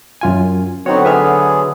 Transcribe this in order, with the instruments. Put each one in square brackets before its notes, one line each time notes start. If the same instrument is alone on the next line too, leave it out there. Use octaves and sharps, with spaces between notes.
[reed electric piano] F#2 F4 G#5
[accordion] D3 F#3 B3 [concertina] C4 F#4 [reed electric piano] D#4 C#5
[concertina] G#4 [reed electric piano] B4 E5 F6